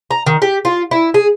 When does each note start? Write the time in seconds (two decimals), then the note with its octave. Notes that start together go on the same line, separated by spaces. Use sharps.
0.11 A#5
0.27 D#3
0.42 G4
0.65 F4
0.91 E4
1.14 G#4